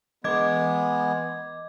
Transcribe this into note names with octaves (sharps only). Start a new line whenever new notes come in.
E3 G#3 B3 D#5 D6 G#6